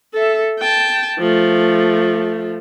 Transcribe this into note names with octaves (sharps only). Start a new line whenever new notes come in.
A4 E5
G5 A5
F3 A3